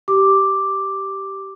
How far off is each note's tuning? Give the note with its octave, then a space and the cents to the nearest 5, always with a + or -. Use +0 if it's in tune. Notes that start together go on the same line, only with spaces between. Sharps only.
G4 -10 D6 +0